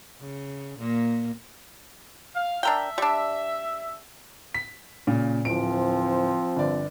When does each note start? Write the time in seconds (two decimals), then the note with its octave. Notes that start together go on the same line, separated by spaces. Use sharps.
0.21 C#3
0.79 A#2 A#3
2.34 F5
2.63 D4 A#4 E5 G5
2.98 G3 D4
4.55 B6
5.07 A#2 C#3
5.45 D1 F3 C4 D7
6.57 G1 D5